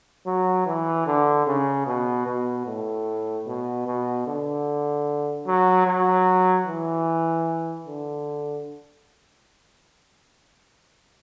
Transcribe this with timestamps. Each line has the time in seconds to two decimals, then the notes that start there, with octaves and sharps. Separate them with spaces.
0.26 F#3
0.66 E3
1.06 D3
1.46 C#3
1.86 B2
2.26 B2
2.67 A2
3.47 B2
3.86 B2
4.27 D3
5.47 F#3
5.87 F#3
6.67 E3
7.87 D3